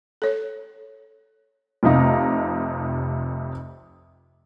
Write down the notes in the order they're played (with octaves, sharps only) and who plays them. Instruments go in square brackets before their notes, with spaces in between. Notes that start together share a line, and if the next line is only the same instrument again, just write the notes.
[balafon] A4 C#5
[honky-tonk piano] F1 F2 C3 D#4 F5 A#5